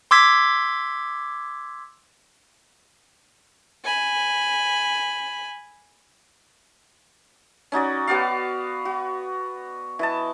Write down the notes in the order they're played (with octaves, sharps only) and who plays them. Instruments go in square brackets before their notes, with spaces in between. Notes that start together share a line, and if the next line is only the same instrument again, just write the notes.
[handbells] C6 D6 E6 G#6 B6
[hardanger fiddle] G#5 B5
[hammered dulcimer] C#4 D#4 F#4 D5
B3 F#4 D5 F5
F#4
E3 D#5 A5